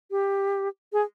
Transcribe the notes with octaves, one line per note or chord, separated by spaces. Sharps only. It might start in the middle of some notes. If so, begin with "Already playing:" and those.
G4
G#4